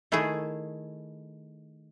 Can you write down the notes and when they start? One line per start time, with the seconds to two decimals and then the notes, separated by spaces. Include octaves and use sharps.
0.12 D#3 A3 E4 G#4